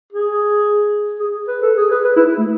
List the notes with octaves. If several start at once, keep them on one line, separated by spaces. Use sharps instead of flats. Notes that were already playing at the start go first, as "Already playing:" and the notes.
G#4
G#4
B4
A4
G#4
B4
B4
E4
E4
A3